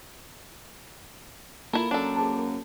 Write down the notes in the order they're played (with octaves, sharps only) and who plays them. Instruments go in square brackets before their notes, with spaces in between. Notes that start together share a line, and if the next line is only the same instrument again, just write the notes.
[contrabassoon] A#2 [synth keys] A#3 [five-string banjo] E4 A4
[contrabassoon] F#2 [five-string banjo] D4 A4
[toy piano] G#4 C5 A5